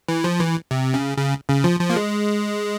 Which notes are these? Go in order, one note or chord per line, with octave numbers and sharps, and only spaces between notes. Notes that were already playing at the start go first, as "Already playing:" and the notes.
E3
F3
E3
C3
C#3
C#3
C#3
F3
F3
A#3
G#3